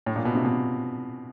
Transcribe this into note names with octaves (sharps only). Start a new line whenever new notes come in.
A2
A#2
B2
C3
B2